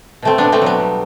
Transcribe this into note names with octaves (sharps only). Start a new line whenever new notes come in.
B2 A3 C4
B3 D4
B2
A3 C4
F#3 B3
G3